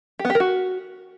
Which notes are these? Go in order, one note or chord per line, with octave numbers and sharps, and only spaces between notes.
G4
B3
G4
A#4
F#4